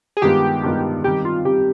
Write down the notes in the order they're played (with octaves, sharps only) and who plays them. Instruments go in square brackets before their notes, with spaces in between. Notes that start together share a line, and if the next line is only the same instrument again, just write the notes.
[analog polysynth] G#4
[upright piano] G2 D#3 G#3 B3 F4 [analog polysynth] G4
[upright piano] G2 D#3 G#3 B3 F4
[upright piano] D#3 G3 C4 [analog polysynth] G4
[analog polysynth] F4
[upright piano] D#3 G3 C4 [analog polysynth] G4